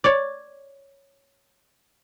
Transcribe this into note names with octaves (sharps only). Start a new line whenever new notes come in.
C#5 D5